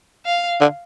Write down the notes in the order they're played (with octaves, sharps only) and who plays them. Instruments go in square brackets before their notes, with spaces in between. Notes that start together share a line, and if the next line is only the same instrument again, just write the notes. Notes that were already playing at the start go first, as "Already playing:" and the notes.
[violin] F5
[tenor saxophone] D3